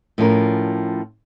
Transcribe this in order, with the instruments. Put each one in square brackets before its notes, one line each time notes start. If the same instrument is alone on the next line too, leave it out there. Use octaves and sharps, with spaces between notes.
[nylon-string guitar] A2 F3 C#4 A#4